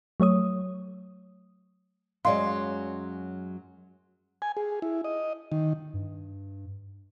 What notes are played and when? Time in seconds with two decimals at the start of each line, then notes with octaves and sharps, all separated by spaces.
0.20 F#3 A3 C#5 D#6
2.25 F#2 F#3 G#3 D5 D#5 F5 C6
4.42 G#5
4.57 G#4
4.82 E4
5.04 D#5
5.52 D#3
5.94 G2